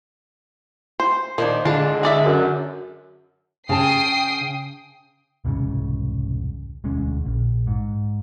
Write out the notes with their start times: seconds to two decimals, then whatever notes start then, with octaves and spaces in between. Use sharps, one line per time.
1.00 C5
1.38 D#3 F3 A#3 D4
1.65 D3 G#3 D4 F4 A5
2.03 G#4 D5 E5
2.26 F#2
3.69 C#3 G5 A5 D#6 C7
5.45 E1 C2 G#2 C#3
6.84 E1 D2 G#3 C#4
7.26 A#1
7.67 G#2